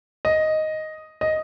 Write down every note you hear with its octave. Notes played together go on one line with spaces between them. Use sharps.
D#5
D#5